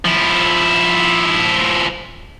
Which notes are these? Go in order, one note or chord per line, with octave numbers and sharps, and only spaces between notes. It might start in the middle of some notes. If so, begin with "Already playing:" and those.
F3 E4